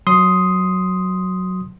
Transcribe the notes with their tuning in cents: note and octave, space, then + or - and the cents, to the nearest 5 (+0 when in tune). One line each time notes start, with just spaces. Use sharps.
F#3 +0 C6 +0 D#6 +5